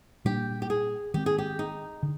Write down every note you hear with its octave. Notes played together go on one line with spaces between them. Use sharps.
A#2 G3 A#3 D4 G4
G4
G#4
D#3 G#3 C4 G4
G#4
G4
D#4
D3